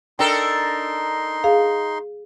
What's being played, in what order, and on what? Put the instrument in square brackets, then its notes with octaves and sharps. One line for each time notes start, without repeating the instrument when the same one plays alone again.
[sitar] D4 A4 A#4 [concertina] D#4 C6 [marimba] G5
[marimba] G#4 F5